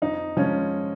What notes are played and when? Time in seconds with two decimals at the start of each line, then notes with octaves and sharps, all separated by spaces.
0.02 F2 D#4
0.37 F3 G#3 C#4